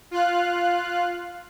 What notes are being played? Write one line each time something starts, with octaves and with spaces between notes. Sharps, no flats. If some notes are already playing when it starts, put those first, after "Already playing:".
F4 F5 F#6